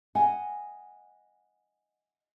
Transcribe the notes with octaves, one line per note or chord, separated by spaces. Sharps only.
D#5 F#5 G#5